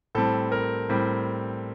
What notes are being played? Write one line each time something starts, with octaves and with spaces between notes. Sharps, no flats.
A2 G3 C4 A4
A#4
A2 G3 C4